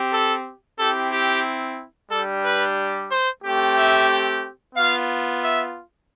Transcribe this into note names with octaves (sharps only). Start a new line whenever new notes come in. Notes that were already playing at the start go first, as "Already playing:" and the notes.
Already playing: C4 G4
A4
C4 E4 G4 A4
G4
G3 D4 G4 A4
B4
C5
A3 C4 G4
E5
B3 F4 F5
E5